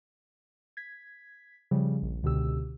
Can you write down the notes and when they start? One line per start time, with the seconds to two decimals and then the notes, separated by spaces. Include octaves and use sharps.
0.77 G#6 B6
1.71 C#3 F3 G3
2.02 A#1
2.23 C#2 B2 D3 G4 E6